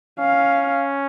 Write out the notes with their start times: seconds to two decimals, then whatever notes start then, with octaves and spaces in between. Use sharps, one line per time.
0.19 C#4 F5